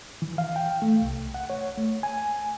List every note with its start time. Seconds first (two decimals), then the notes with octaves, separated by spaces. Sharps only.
0.22 E3
0.38 F5
0.56 G5
0.82 A3
1.02 C2
1.34 F#5
1.50 C#5
1.77 A3
2.03 G#5